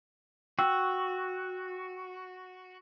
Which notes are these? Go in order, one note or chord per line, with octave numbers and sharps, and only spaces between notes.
F#4 G5 E6